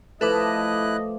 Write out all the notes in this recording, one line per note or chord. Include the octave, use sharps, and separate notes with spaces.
F3 A3 E4 A4 B4 D#5 D6 F#6